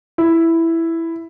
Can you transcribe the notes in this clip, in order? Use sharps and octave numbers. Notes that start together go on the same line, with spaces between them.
E4